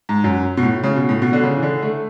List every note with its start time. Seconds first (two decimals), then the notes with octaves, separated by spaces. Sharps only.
0.09 G#2
0.24 F#2
0.57 B2
0.63 A2
0.83 C#3
0.96 B2
1.09 A2
1.22 B2
1.33 D3
1.44 C#3
1.57 E3
1.63 D3
1.82 A3